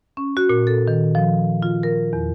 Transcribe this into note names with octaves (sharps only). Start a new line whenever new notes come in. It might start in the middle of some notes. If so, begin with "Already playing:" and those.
C#4
F#4
A#2
A4
D#3
F3
F4
A#4
E2